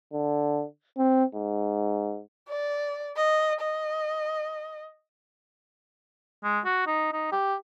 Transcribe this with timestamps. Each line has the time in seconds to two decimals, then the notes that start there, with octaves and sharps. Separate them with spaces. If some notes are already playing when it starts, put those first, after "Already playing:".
0.13 D3
0.98 C4
1.35 G#2
2.49 D5
3.16 D#5
3.61 D#5
6.44 G#3
6.65 F#4
6.87 D#4
7.13 D#4
7.32 G4